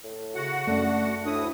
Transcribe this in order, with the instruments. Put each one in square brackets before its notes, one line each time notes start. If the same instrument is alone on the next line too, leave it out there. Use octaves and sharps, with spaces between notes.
[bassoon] A2
[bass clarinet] C#3 [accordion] F#4 F#5
[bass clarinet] F#2 [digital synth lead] A3 [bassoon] D4
[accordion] D2 D#6 [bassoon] A2 [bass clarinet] D4 [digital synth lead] E4